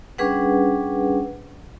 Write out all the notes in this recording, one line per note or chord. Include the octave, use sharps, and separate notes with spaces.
G3 C#4 D4 G#4 B4 F#5